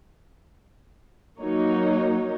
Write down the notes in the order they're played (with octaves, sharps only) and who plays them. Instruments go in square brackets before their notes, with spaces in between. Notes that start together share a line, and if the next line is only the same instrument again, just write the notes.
[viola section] F#3 A#3 D#4 C#5